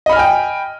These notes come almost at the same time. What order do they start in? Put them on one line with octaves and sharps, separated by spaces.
D#5 B5 F6 G#5 G5